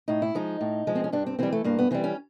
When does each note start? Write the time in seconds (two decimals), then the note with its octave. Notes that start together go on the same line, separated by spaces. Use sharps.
0.08 A2 D#4
0.22 E4
0.35 F3 G#3 D#4
0.61 A2
0.87 F3 G#3
0.95 C4
1.04 C#4
1.12 G2 D4
1.26 C4
1.39 E3 G3 C4
1.52 A3
1.64 G2 A#3
1.79 B3
1.91 E3 G3 C4
2.04 C#4